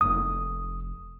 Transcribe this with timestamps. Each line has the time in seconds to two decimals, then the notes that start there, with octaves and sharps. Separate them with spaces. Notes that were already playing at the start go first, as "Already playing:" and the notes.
0.01 F1 D#6